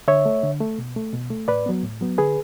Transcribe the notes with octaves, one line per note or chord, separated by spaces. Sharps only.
D3 C#5 E5
A3
D3
A3
B2
A3
B2
A3
A2 B4 D5
F#3 B3
A2
F#3 B3
D3 G#4 B4